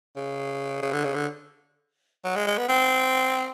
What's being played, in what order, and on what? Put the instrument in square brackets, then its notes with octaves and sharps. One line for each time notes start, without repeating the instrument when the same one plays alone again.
[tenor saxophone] C#3
C#3
D3
C#3
D3
F#3
G#3
G#3
B3
C4